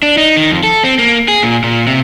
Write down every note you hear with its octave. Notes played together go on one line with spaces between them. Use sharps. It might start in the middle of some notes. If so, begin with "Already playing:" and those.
D4
D#4
D#3
F2
A4
C4
A#3
G#4
A#2
A#2
C3